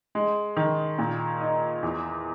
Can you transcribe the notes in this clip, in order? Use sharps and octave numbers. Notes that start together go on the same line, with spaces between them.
G#3
D#3
A#2
D#4
E2